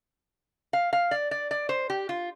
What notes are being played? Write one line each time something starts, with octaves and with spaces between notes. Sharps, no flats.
F5
F5
D5
D5
D5
C5
G4
F4